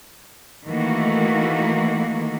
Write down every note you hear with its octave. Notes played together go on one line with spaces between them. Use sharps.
D#3 E3 A3 A#3 F#4